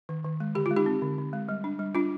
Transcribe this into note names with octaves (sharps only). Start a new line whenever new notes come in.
D#3
D#3
G#3
D3 G4
G#3 F4
D#4 G4
C4
D3
D3
G#3
G3
D4
G3
D4 F4